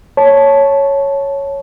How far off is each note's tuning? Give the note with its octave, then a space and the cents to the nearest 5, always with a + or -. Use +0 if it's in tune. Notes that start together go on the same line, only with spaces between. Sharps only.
C#5 +0 A5 -10